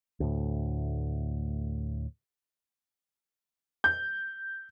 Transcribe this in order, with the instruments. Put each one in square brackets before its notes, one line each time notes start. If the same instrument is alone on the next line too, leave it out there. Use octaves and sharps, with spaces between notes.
[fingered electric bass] D2 A2
[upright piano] G6